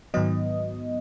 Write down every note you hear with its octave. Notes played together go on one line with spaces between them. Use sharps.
G#2 D#3 F#3 B3 D#5